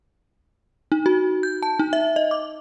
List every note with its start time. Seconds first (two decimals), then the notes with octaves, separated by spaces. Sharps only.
0.92 D#4
1.06 F#4
1.43 G6
1.63 A5
1.79 D#4
1.93 E5
2.16 D#5
2.31 D6